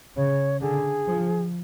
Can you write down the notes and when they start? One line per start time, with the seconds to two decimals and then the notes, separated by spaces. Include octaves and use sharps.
0.16 C#3 C#5
0.61 D3 G#4
1.07 F3